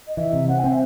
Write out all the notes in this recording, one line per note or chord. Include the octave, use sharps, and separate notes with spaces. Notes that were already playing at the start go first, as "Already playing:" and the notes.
D#5
E3 E5
C3
C4 F#5
G#5
C4
E5